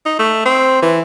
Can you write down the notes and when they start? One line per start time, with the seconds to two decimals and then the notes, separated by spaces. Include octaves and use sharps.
0.05 D#4
0.19 A3
0.46 C4
0.82 E3